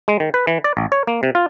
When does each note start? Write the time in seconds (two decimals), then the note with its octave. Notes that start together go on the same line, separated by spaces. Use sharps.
0.08 G#3
0.20 D#3
0.34 B4
0.47 E3
0.64 D5
0.77 A1
0.92 C#5
1.07 A#3
1.23 C3
1.35 F4